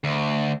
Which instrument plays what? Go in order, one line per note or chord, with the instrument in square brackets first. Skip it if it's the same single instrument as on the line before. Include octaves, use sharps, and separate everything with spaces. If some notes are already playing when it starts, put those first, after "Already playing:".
[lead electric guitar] D2